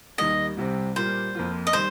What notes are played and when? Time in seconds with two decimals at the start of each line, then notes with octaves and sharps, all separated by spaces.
0.18 D#2 D#3 G3 A#3 D#5
0.57 C2 C3 G3 C4 G4
0.95 A#2 G3 A#3 F4 C5
1.35 F2 F3 A#3 F4
1.67 D#5
1.73 D#3 G3 C5